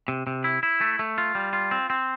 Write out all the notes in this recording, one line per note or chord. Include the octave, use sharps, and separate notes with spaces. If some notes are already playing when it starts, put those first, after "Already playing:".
C3
C3
E4
E4
A3
A3
F4
G3
F4
C4
C4